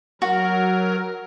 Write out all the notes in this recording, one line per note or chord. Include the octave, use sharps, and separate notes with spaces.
F#3 F#4 A#4